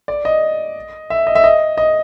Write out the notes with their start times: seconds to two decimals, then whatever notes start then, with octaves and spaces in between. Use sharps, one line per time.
0.08 D5
0.25 D#5
1.10 E5
1.27 D#5
1.35 E5
1.44 D#5
1.77 D#5